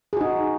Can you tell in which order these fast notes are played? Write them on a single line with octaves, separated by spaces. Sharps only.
G#4 F#4 D#4